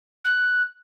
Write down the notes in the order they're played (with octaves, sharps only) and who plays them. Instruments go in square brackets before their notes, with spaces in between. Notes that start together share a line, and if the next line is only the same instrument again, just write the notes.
[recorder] F#6